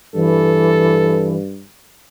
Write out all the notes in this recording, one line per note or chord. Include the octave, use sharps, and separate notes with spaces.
G2 E3 A4